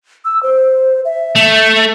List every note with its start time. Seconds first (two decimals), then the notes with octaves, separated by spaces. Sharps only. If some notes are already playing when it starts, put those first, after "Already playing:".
0.25 E6
0.43 C5
1.05 E5
1.36 A3